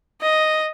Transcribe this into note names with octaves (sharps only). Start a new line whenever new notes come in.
D#5